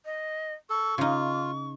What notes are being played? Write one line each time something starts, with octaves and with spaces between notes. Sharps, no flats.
D#5
A4 C#6
C#3 D#4 F4